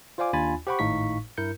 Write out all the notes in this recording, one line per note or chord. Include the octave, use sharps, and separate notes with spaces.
F4 C5 D5 F5 G#5 D6
D#2 D4 F4 G#5 B5 A6
G4 C5 F#5 G5 B5 C#6
G#1 A2 D#4 F5 C#6 B6
G2 E4 A#4 G6 C#7